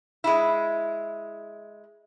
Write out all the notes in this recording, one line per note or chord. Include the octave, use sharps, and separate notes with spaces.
G#3 E4